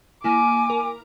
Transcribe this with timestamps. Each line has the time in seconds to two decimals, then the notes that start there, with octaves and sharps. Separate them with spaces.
0.24 A#3 E4 G#5 D6
0.70 A#4